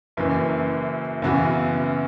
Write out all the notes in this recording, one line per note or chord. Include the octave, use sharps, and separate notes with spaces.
F#1 F#2 E3
F#2 C#3 E3 B3 F#4